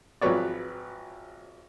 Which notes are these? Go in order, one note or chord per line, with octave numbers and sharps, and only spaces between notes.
G#1 F3 F#3 B4 C#5 D5